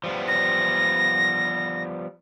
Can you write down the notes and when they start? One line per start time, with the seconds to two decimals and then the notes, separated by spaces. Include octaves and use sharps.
0.04 F3 G3 B3
0.28 A#6